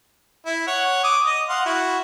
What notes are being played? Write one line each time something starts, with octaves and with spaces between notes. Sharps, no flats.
E4
C#5 F#5
D6 D#6
D#5
F5 F#5 C6
E4 F#4